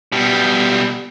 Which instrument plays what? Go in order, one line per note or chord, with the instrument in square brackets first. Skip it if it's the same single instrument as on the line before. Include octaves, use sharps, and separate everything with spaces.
[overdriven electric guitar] B2 G3